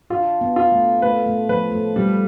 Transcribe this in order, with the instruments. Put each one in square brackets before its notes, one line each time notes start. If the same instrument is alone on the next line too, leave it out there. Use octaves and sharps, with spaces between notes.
[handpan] D4 [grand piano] F4
[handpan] B3
[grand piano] F4
[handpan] A3
[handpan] A3 [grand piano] B4
[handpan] A3
[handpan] F3 [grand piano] B4
[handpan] A3
[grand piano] G3